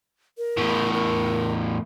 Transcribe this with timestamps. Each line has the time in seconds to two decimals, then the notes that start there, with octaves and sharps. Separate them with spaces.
0.38 A#4
0.57 E2 A2
0.93 A#4